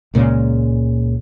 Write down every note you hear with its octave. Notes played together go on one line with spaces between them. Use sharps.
C#2 A#2 C#3 G#3